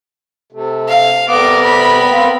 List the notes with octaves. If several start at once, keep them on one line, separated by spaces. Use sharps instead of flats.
C3 A3
F5
C3 G3 A3 B3 A#4 D6
B5
A#3 C4